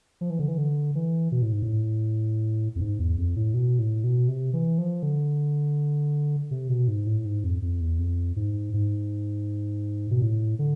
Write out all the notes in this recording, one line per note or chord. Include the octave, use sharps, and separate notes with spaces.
F3
E3
D3
E3
D3
E3
B2
A2
G#2
A2
F2
G#2
E2
F2
A2
B2
A2
B2
C3
E3
F3
D3
C3
B2
G#2
A2
G#2
F2
F2
E2
F2
G#2
G#2
B2
A2
D3